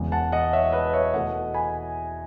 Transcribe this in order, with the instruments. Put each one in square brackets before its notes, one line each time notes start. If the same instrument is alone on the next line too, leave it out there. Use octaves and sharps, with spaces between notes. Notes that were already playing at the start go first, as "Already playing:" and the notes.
Already playing: [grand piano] E1 E2 C#3 G#3
F#5 A5
D#5 F#5
C#5 E5
B4 D#5
C#5 E5
E2 B2 A3 D#5 F#5
G#5 B5